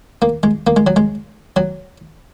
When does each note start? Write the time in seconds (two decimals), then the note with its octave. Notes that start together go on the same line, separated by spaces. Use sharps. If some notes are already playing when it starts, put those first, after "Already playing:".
0.22 A#3
0.43 G#3
0.67 A#3
0.76 G#3
0.87 F#3
0.96 G#3
1.56 F#3